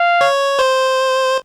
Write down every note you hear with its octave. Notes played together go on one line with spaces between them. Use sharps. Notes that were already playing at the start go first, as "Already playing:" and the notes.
Already playing: F5
C#5
C5